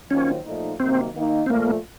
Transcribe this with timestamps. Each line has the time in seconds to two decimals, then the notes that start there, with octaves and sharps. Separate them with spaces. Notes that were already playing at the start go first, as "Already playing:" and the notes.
0.11 D#3 F#3 A#3 C#4 F4 C5
0.45 A#2 F3 A3 D#4
0.80 C3 D#3 F#3 A#3 C4
1.15 D#3 A#3 D#4
1.46 C4
1.50 A#2 F3 A3 A#3